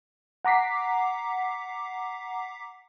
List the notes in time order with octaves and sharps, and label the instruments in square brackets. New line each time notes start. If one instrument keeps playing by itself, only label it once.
[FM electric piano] F#5 A#5 D6 B6 C7